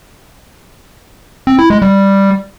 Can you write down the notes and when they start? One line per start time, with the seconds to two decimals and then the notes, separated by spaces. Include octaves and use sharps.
1.47 C4
1.59 E4
1.70 G#3
1.82 G3